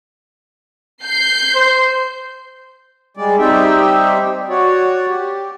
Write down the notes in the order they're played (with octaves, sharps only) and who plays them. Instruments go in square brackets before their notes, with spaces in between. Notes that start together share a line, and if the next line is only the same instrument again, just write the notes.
[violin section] G6 C7
[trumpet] C5
[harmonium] G3 G#3 D5
G3 C4 D#4 G4 E5 G5
F#4 C#5 D5
G4